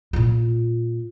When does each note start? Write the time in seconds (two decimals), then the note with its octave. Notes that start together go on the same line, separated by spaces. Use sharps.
0.13 A#2 F4